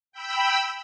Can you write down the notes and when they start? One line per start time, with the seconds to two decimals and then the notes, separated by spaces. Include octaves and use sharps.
0.12 G5 B5 E6